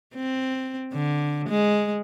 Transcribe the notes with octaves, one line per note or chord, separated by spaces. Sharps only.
C4
D3
G#3